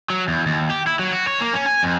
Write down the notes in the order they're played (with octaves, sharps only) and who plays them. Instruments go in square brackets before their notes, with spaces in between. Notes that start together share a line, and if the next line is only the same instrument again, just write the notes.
[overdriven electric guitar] F#3
E2
D#2
G4
E4
F#3
F#4
C#5
A#3
C#4
G#5
F2